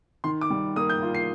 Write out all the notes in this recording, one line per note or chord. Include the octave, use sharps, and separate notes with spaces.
D#3 C6
D6
G3
A#3 D#6
G6
F4
C7